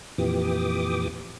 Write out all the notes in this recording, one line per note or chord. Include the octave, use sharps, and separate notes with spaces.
F2 A#2 E3 G4 D6 D#6